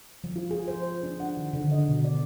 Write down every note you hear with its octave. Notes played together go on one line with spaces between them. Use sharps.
F3
F4
G#4
C5
D4
F#5
D#3
D3
D#5
B2
D5